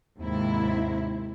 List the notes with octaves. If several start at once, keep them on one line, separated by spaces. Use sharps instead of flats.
D#2 G#2 C3 E4